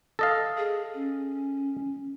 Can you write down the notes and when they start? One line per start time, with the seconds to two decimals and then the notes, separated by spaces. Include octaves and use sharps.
0.19 A4 D#5 F5
0.58 G#4
0.94 C#4